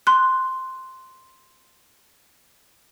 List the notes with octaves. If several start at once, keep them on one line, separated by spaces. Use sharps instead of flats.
C6 F#6